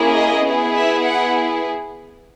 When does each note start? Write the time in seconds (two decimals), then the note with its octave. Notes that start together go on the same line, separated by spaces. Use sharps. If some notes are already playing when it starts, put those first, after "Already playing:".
Already playing: A#3 C#4 E4 G#4
0.13 D#5
0.44 B3 E4 G#4
0.74 E5
1.05 F#5